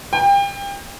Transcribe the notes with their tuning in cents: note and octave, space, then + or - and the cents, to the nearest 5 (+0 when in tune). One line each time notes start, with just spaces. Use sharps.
G5 +30